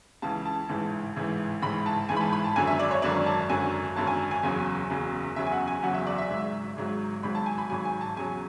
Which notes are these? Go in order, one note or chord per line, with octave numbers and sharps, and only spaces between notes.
C#2 C#3 E3 A5
A5
A1 G#2 E3
A1 G#2 E3
A1 G#2 E3 B5
A5
A1 G#2 E3 G#5
B5
A5
B5
A5
G#1 F#2 D3 F#3 G#5
E5
D5
C#5
G#1 F#2 D3 F#3 D5
A5
G#1 F#2 D3 F#3 G#5
G#1 F#2 D3 F#3 A5
G#5
G#5
F#1 E2 C#3 F#3
F#1 E2 C#3 F#3
F#1 E2 C#3 F#3 E5
G#5
F#5
G#5
F#1 E2 C#3 F#3 F#5
E5
D5
E5
G#1 G#2 F#3
G#1 G#2 F#3
G#1 G#2 F#3 B5
A5
G#5
B5
G#1 G#2 F#3 G#5
G#5
A5
E2 C#3 F#3 G#5